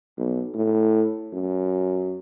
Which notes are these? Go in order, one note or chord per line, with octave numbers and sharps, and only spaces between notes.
B1
A2
F#2